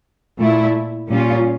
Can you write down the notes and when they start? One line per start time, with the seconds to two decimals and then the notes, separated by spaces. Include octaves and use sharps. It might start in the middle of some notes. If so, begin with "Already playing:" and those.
0.39 A#2 A3 E4
1.09 A#2 G3 C#4 F4